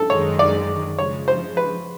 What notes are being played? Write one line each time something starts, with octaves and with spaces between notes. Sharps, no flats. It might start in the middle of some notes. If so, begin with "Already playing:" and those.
Already playing: A4
F#2 D#3 G#3 C#5
D5
C#3 F3 G#3 C#5
C5
B4